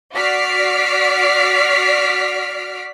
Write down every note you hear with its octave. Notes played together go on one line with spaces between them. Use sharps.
F#4 D5 F6 B6 C7 D7